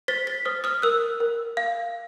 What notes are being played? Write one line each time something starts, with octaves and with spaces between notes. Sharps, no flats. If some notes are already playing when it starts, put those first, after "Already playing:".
C5 A6 B6
A6 B6
C5 D#6 F6
D#6 F6
A#4 E6 F#6
A#4
F5